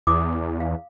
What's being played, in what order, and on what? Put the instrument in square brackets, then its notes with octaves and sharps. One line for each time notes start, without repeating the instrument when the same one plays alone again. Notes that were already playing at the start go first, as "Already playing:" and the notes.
[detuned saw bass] E2 [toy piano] D6 D#6
[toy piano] F5